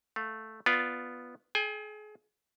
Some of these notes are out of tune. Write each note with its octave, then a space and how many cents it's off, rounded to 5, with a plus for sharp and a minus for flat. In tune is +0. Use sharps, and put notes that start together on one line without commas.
A3 +0 F5 +15
B3 +0 F4 +0 D5 +0
G#4 +35 G#5 -45